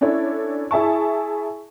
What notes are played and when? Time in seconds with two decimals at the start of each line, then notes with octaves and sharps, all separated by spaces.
0.01 C#4 D4 E4 A4 C#5 D5
0.71 E4 G#4 E5 A5 C#6